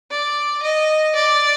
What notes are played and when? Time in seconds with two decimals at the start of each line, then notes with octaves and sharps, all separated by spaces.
0.11 D5
0.63 D#5
1.15 D5